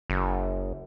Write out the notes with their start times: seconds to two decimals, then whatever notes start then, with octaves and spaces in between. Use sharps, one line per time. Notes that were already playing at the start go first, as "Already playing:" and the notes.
0.10 F#1